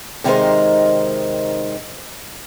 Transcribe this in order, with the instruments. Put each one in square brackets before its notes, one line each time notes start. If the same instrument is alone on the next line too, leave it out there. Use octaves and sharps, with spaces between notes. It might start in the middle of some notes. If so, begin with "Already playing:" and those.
[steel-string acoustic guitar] C3 D#3 G#3 D#4 A#4 C5